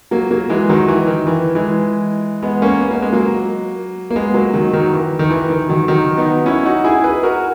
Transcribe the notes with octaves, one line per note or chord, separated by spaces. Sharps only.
F#3 A#3
F#3 A#3
E3 G#3
D#3 F#3
E3
D#3
E3
E3 G#3
G#3 B3
A#3 C#4
B3
A#3
G#3
F#3 A#3
A#3
G#3 B3
F#3 A#3
D#3 F#3
D#3 F#3
E3
D#3
E3
D#3
D#3 F#3
D#3 F#3
B3 D#4
C#4 E4
D#4 F#4
E4 G#4
G#4 B4
F#4 A#4